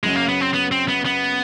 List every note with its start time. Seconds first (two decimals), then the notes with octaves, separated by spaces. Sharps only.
0.03 F#2 C#3 F#3 G#3
0.16 A#3
0.29 B3
0.41 C4
0.54 B3
0.72 C4
0.88 B3
1.06 B3